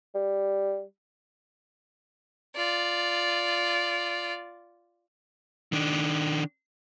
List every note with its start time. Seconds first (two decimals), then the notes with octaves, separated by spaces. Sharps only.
0.15 G3
2.56 F4 D5
5.72 D#3 D4